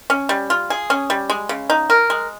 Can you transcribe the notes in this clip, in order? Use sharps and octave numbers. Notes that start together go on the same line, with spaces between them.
C#4
G3
F4
G#4
C#4
G3
G#3
C#3
D#4
A#4
G#3